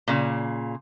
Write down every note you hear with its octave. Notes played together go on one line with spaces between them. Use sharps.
A#2 C#3